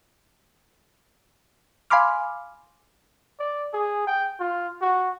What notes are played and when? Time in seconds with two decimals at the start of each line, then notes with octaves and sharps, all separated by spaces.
1.90 F5 G#5 B5 C6 D6 F6
3.40 D5
3.74 G#4
4.07 G5
4.40 F4
4.81 F#4